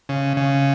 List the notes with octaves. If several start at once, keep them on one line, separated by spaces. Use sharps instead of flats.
C#3
C#3